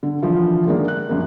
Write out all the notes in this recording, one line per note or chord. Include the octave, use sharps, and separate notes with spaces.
D3
D3 E3 F3 F4
D3 D#3 G#3 A#3 D4
F#6
A#1 F#2 A#3